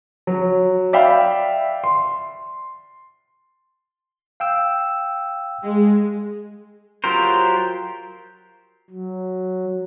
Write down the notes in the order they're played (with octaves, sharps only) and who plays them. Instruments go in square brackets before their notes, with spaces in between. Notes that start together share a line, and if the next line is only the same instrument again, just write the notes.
[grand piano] F#3
D5 E5 F5 G5 B5
C6
[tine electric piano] F5 G5 E6
[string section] G#3
[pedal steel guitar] F#3 F4 G4 A#4 C5
[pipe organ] F#3